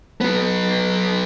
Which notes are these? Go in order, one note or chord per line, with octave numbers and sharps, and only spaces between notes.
F#3 B3